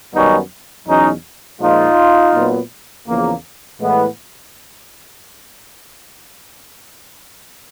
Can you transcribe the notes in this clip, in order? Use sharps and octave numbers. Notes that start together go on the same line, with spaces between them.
F#2 D#3 G3 B3 C#4 D#4
E2 B2 F#3 C#4 D#4
A#2 F3 G#3 D#4 F4
A#2 F#3 B3
E2 C#3 F3 A#3
A2 E3 G#3 B3